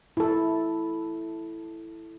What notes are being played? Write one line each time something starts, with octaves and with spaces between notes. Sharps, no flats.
E4 A4